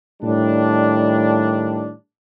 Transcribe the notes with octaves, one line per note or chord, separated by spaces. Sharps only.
A2 D#3 G3 D4